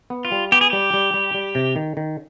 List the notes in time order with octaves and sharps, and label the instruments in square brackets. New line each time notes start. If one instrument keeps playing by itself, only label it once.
[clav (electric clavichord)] B3
[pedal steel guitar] F4
[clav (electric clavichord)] G3
[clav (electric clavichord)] B3 [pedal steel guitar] G4
[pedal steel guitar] G#4
[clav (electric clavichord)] G3 [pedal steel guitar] G4
[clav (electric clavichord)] G3
G3
G3
C3
D#3
D#3